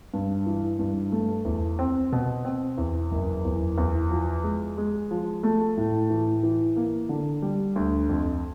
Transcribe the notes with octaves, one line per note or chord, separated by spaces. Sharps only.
G2
E3
G2
A3
E2
C4
B2
C4
E2
F#1
E2
E2
F3
G#3
G#3
F3
A3
A2
E3
E3
A#3
D3
G3
D2
F2